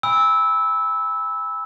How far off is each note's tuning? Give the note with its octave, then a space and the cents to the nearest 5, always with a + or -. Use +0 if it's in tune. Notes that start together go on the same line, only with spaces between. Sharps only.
G#5 -40 B5 +0 E6 -15